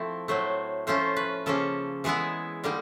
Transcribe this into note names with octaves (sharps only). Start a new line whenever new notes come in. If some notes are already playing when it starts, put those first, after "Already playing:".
Already playing: F3 A3 C4 E4
A2 F#3 A3 C5
F3 A3 C#4 F4 C5
B4
C#3 F3 A#3 C#4 A4
E3 G#3 B3 E4 G#4
D3 G3 A#3 D#4